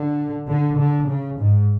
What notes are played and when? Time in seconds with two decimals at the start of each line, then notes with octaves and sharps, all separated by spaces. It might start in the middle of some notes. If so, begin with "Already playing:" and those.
Already playing: D3
0.49 D3
0.79 D3
1.09 C#3
1.40 G#2